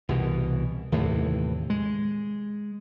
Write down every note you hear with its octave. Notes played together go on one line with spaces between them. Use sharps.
C2 B2 E3
D#2 A2 C3 E3
G#3